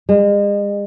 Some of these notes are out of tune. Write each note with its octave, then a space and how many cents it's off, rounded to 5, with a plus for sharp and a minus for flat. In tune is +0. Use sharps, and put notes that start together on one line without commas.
G#3 -40